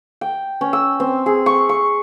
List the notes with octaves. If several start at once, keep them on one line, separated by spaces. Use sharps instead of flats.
G5
C#4
E6
C4
G#4
C#6
C#6